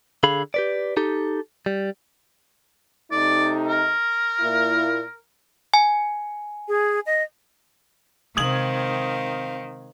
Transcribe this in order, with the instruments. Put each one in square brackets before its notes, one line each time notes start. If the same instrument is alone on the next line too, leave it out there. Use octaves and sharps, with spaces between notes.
[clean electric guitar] D3 G#4 F5 B5
G4 B4 D5
D#4 G4 A4
G3
[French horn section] C3 A3 D#4 [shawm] D5
[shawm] A#4
[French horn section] A#2 A#3 E4
[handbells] G#5
[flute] G#4
D#5
[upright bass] C3 G#3 [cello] D#3 [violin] C4 F5 [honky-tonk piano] D#6 G#6 F#7